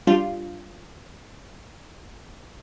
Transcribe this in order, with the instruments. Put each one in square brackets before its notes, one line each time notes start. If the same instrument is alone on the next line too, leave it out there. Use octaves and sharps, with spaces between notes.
[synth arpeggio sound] G3 D4 F4